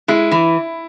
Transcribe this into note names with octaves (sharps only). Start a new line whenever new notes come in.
G#3 E4
E3